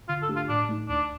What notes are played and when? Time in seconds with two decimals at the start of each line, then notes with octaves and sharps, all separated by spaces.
0.09 D3 F4
0.22 A4
0.29 A3 D4 G4
0.36 F4
0.49 A2 D4
0.69 A3 D#4
0.89 D2 D4